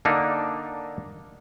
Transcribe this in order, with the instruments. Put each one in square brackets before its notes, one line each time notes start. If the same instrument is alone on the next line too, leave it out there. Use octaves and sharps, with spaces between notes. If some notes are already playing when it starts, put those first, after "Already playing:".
[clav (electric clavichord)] D3 A#3 D4 D#4